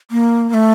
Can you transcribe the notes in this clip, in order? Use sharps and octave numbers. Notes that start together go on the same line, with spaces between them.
A#3
A#3
A3